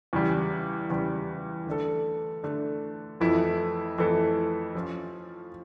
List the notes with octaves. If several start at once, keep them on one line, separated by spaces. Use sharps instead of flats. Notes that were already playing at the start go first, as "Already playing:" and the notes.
E2 C#3 G3
E2 C#3 G3
D3 A3 D4 A4
D3 A3 D4 A4
F2 E3 A3 E4 A4
F2 E3 A3 E4 A4
F3 C#4 F4